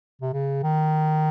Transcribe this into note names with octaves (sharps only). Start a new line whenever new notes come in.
C3
C#3
D#3